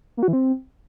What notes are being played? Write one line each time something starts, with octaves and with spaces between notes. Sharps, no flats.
A#3
F#4
E3
C4